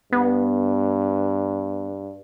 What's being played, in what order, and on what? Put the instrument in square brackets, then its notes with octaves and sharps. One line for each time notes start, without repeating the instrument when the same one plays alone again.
[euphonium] G2 [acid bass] B3